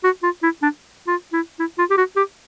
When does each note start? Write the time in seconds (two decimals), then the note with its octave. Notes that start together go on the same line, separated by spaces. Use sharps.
0.04 F#4
0.23 F4
0.43 E4
0.62 D4
1.07 F4
1.33 E4
1.59 E4
1.78 F4
1.90 G4
1.98 F#4
2.16 G4